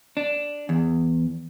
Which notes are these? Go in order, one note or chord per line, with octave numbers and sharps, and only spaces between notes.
D4
E2